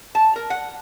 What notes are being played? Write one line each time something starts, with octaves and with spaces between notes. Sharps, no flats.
A5
A#4
F#5